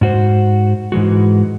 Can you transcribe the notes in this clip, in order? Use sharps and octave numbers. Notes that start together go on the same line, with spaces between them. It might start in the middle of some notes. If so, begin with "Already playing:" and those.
G#2 F#4 C5
G#2 E3 G#3 F#4